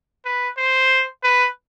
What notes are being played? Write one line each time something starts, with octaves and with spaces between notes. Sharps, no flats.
B4
C5
B4